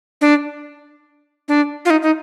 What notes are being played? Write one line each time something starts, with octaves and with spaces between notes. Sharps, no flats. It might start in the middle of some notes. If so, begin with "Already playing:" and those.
D4
D4
F4
D#4
D#4